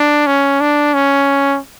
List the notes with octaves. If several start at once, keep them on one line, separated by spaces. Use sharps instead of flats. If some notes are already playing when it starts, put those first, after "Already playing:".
Already playing: D4
C#4
D4
C#4